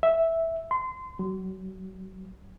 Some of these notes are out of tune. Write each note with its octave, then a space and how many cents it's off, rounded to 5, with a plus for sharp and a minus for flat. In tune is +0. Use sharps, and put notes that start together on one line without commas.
E5 -5
C6 -25
F#3 +35